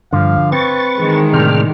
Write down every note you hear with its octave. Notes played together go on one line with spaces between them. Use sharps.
G2 D3 F3 F5
C4 B4 C#6 A6
D#3 E3 G#3
A2 C3 D4 G5 F6